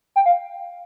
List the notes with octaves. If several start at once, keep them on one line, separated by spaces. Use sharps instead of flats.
G5
F5